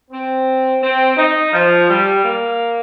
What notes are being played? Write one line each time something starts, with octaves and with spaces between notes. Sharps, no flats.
C4
C4
D#4
F3
G3
A#3